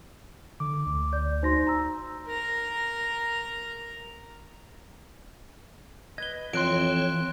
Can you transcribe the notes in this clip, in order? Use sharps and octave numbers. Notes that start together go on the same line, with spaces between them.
D3 D6
D2
D5 G6
D#4 F#4 C5 C6 A#6
A#5 E6
A#4 A#5
B4 D#5 G#6 G7
F2 E3 C4 C#5 C6 F#6 D7